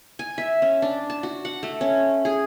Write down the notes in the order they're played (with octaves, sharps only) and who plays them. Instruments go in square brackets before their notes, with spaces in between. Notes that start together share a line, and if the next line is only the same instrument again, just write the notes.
[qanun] G#5
E5
C#4
D4
A5
F#4
F#5
A3
C#4
G#4